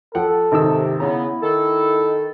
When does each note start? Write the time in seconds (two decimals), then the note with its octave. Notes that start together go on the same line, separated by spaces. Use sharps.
0.15 F3 A4 F#5 G5
0.52 G#1 C3 D#3 E6
1.00 C#3 B3 E4 A#5
1.42 D#3 A4